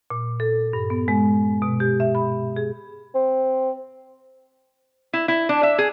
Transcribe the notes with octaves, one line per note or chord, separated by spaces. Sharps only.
A#2
A4
G2
B3
G#3
B2
G4
E5
B5
G#4
C4
E4
E4
D4
E5
G#4